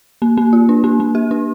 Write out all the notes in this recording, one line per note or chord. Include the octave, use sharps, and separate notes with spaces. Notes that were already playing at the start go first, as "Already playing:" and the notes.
A#3
A#3
F4
D4
A#3
A#3
G4
D4